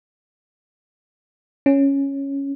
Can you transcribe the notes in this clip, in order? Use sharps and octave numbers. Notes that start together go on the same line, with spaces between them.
C#4